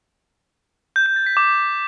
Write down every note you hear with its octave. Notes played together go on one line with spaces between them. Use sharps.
G6
G6
A6
B6
D6